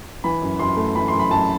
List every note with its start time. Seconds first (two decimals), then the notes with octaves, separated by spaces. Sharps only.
0.24 E3 B5
0.42 F#2
0.59 F#2 C6
0.77 A3
0.95 E3 B5
1.08 C6
1.13 F#2
1.19 B5
1.31 F#2 A5